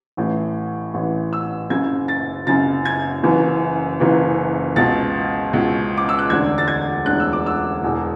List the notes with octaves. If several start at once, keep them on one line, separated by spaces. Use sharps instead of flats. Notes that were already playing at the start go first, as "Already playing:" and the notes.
A1 A2 E3
A1 A2 E3
E6
F#1 F#2 C#3 G#6
A6
F#1 F#2 C#3 A6
G#6
F#1 F#2 E3
F#1 F#2 E3
C#2 B2 A6
C#2 B2
D6
E6
F#6
E1 D2 D3 G#6
A6
G#6
E1 D2 D3 F#6
E6
D6
E6
E1 E2 B2